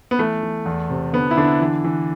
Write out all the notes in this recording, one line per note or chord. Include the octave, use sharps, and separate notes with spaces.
B3
E3 A3
E3
E2
C3
D3 B3
E4
D3 D4
E3
E3